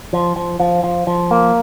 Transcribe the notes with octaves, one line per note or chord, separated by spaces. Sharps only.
F3
F3
F3
F3
F3
A#3